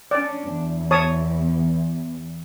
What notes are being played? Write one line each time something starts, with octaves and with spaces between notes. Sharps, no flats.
C#4 D4 D5
E2
C#5 A5 D#6